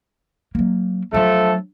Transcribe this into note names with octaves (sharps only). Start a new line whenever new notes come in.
F#3 A#3
F3 F#3 A3 D4 A4